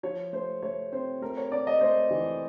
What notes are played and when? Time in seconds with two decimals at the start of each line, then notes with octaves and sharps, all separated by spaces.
0.03 F3 C#5
0.33 A3 C5
0.63 A3 C#5
0.92 C4 C5
1.21 A3 A#4
1.37 C#5
1.51 C4 D5
1.67 D#5
1.81 A3 C5
2.10 E3